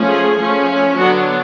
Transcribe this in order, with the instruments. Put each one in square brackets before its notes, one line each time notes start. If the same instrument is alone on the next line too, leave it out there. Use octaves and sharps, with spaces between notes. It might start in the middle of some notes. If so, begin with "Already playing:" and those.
Already playing: [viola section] F3 A3 C#4
G#4
F3 A3 C#4
D3 F#3 B3 D4 F#4